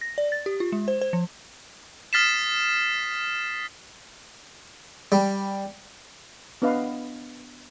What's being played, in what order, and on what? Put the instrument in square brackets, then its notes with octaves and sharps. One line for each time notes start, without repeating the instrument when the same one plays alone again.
[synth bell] A#6
D5
A6
G4
F4
G#3
C5
C5
F3
[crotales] D#6 F6 A6 B6 C7 E7
[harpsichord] G3
[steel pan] B3 D4 B4 D#5 F5